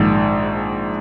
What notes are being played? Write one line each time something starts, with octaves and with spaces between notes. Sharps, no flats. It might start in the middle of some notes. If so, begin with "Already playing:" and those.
Already playing: A#1 G#2 D#3